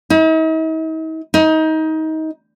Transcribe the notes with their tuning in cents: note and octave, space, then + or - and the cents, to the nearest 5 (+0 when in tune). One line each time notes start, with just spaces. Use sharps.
D#4 +45
D#4 +25